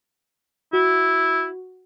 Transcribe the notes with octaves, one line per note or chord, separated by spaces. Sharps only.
E4 F#4